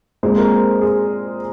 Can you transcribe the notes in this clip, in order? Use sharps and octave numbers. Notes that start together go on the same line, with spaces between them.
A#2 G#3 C4 C5
A#4
G#4